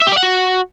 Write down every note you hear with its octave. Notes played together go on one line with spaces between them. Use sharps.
E5
G4
D5
F#5
F#4